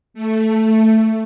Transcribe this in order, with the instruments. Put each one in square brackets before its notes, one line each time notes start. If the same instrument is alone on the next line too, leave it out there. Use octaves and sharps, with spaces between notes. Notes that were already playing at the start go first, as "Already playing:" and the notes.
[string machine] A3